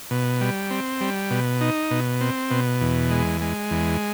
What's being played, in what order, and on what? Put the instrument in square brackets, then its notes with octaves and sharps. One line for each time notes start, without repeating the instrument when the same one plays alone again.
[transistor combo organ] B2
G3
C4
G3
B2
D#4
B2
C4
B2
E2
G#3
G#3
E2